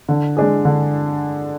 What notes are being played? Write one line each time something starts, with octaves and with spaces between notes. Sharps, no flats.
D3
G#3 D4 G#4
D3